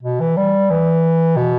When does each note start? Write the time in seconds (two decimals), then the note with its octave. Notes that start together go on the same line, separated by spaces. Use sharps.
0.03 B2
0.20 E3
0.37 G3
0.70 E3
1.36 B2